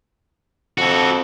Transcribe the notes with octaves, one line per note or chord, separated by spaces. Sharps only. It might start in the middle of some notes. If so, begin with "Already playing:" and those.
F2 F#4 A4